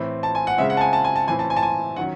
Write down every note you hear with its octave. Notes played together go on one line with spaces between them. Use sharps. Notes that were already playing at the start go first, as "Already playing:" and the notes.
Already playing: A2 E3 C4
A5
G#5
F#5
C#3 G#3 C4 E5
F#5
A5
G#5
A5
G#5
A5
A2 E3 C4 G#5
A5
G#5
A5
G#5
D#3 F#3 C#4 F#5